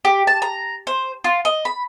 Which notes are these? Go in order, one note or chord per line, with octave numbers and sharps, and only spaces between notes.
G4
A5
A#5
C5
F4
D#5
B5